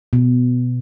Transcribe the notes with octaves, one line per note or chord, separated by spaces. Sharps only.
B2